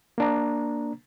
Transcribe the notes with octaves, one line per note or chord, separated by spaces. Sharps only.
A#3 D4 A#5